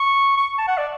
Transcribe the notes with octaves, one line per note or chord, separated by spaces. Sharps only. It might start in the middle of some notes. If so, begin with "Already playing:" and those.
Already playing: C#6
C#6
A5
F#5
D5